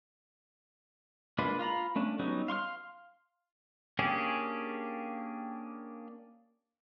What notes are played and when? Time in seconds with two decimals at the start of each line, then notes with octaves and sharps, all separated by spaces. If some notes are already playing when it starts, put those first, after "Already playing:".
1.38 G#3 A#3 D4 F4 B4
1.59 F4 F5 A#5 B5
1.96 A3 C#4 D4
2.19 F#3 G3 B3 C#4 D#4
2.48 F5 C6 C#6 F6
3.99 A#3 C#4 D4 G4 G#4